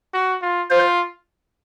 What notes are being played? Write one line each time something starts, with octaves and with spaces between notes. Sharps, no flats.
F#4
F4
F4 C5